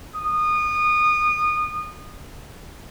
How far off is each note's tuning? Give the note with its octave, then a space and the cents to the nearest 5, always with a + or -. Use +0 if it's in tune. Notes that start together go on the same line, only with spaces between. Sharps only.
D#6 -25